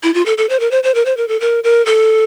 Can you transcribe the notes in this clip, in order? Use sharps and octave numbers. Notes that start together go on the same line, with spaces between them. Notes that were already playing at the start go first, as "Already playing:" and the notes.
E4
F4
A4
A4
C5
A#4
C5
C5
A#4
C5
A#4
A4
A#4
A#4
A4